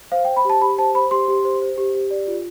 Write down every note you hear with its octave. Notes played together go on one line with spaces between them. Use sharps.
C5 F5
G5
C5
B5
G4 A5
G4 B5
C5 A5
C5 B5
G4 C6
G4
C5
C5
G4
G4
D5
F4